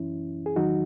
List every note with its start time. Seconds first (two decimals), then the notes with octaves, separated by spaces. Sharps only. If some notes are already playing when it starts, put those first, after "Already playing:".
Already playing: F#2 E3 C#4 E4
0.46 G#4
0.56 E2 D#3 F#3 D#4 F#4